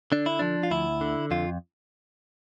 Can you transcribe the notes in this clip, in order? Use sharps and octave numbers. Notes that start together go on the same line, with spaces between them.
D3 D4
E4
F3 D4
F4
D2 E4
D3
F2 F4